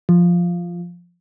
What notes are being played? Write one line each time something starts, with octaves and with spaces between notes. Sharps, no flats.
F3